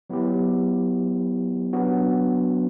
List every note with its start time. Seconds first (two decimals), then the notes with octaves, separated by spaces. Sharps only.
0.10 F#3 B3 E4 G4
1.73 F#3 B3 D4 F#4